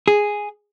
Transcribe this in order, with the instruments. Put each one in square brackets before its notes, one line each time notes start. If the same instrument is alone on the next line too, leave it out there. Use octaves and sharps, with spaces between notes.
[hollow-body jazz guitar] G#4